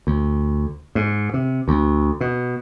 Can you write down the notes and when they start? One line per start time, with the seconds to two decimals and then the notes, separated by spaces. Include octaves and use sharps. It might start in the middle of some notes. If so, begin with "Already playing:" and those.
0.07 D2
0.95 G#2
1.34 C3
1.68 D2
2.21 B2